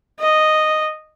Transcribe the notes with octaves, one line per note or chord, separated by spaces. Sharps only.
D#5